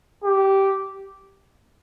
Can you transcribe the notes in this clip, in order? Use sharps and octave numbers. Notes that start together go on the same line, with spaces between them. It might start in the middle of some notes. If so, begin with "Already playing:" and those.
G4